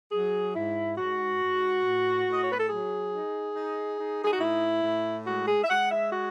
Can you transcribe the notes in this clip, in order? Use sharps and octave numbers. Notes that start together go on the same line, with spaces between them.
F#3 G#4
G#2 E4
G#2 F#4
G#2
A2
A2
D#5
C#5
B4
A4
F#3 G#4
D#4
D#4
D#4
G#4
F#4
A2 E4
A2
G#3 F#4
G#4
E5
G#3 F#5
E5
F#4